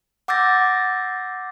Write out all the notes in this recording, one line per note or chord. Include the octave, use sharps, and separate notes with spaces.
F#5 D6 E6 G6 A6 A#6